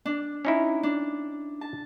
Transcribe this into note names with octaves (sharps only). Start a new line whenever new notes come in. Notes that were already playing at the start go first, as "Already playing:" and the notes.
D4
C#4 D#4 E4
D4
A5